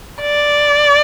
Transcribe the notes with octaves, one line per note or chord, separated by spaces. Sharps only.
D5